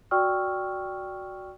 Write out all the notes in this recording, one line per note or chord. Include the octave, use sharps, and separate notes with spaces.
F#4 D5 G5 C#6 E6 F6